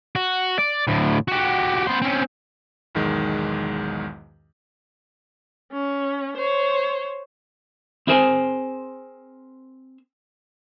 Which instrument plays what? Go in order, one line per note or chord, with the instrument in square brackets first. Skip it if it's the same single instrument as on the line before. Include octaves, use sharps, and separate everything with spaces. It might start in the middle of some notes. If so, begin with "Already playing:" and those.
[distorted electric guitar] F#4
D5
D2 A2
F#4 G4
B3 C5
C4 C#4
[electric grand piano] B1 E2 G#2 D#3 G#3
[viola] C#4
C5 C#5
[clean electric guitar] C4 E4 G#4 A#4 C5 G#5